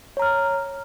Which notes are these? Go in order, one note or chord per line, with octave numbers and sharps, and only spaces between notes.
C#5 A#5 F6